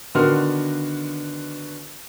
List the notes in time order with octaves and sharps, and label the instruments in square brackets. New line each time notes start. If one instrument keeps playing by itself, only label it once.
[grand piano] D3 D#3 B3 F#4 C6 F6